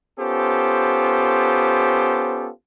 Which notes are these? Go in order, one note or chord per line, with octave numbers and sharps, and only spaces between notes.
B3 C#4 F4 G4 A4 C5